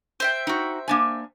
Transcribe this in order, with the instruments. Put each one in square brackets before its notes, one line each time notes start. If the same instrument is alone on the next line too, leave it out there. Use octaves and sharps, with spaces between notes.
[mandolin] C5 E5 G5
[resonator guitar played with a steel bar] D#4 F#4
A#3 D4 G#5